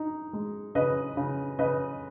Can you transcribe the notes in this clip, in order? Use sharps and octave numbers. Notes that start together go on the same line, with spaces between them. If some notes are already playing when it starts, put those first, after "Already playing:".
Already playing: D#4
G#3
C#3 B4 D#5
C#3
C#3 B4 D#5